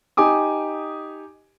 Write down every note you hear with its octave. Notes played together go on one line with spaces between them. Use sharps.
D#4 G4 G#5 D6 D#6